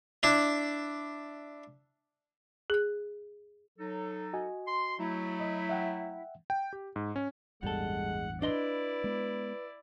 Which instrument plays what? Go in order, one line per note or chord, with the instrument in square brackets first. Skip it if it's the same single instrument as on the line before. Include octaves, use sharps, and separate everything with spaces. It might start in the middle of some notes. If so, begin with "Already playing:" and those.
[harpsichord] D4 E4
[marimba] G#4 F#6
[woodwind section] F#3 D#4 A4
[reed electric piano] F#4 D#5 G#5
[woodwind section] C6
F#3 A3 E4
[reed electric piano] D#5
E5 F#5 G5
[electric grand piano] G5
G4
G#2
C#4
[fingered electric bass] A1 E2 G2 [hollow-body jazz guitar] G3 A4 [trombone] G#3 [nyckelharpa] F#5
[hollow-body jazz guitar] D4 D#5 C6 [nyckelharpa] E4 D5 [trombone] B4
[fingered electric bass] G#3 B3